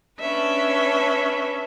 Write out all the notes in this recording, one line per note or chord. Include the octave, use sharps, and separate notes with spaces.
C#4 D4 B4 E5